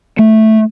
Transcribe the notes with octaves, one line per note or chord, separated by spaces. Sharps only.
A3